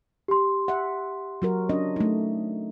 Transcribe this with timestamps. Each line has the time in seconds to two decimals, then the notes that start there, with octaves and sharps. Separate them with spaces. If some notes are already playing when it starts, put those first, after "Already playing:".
0.28 G4 C6
0.68 E5 F#5
1.42 F#3 F#4 A#4
1.69 C#4 D4 D#5
1.96 A3 D#4